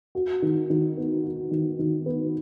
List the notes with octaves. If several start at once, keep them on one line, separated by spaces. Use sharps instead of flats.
F#4
D#3
D#3
B3
F#4
D#3
D#3
B3